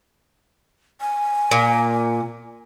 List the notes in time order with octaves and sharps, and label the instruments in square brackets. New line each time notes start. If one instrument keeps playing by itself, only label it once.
[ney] G#5
[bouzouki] A#2